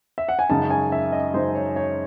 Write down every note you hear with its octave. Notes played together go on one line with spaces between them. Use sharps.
E5
F#5
G#5
F#2 C#3 G#3 D#4 A5
G#5
E5
D#5
F#2 C#3 G#3 D#4 C5
C#5
C#5